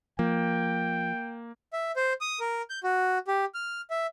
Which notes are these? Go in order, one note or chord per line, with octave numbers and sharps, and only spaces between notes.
F3 A#3 G5
E5
C5
D#6
A#4
G6
F#4
G4
F6
E5